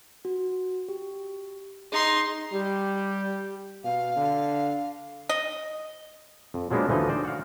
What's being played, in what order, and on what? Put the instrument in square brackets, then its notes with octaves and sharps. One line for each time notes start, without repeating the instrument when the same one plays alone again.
[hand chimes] F#4
G4
[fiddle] D#4 C6 [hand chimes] G#4
[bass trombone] G3 [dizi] G4
[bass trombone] B2 [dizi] F5
[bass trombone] D3
[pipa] D#5
[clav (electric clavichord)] F2
F3 F#3 G#3 A#3 B3 D4
D2 E3 F3 D#4 D#5
C5 D5
F#4 F5